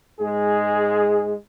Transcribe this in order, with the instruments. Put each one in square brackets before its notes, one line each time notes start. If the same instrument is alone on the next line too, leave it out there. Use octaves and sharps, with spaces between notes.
[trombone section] G#2 G#3 G#4